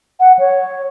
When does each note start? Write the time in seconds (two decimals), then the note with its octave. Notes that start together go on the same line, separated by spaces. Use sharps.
0.20 F#5
0.39 C#5